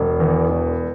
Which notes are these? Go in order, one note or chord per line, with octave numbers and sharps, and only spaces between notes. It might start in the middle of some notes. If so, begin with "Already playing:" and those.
Already playing: E1
E2
E1